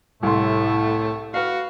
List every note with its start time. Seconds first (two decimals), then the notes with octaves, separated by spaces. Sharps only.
0.23 C2 A2 A3 C6
1.34 F#4 B4 F5